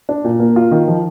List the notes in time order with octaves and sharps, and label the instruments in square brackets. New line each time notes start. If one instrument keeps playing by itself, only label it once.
[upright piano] D4
A#2
A#3
F4
D#3
F3